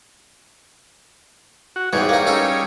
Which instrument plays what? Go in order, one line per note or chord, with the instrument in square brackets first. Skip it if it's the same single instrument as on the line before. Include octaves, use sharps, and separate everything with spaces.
[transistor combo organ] F#4
[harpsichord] E2 G#2 E3 [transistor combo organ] G3 G#4 C#5
[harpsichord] A#3 D#4
C#4 D#4 A4